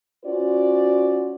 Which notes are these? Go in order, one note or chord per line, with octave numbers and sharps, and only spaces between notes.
C#4 F4 F#4 C5 D5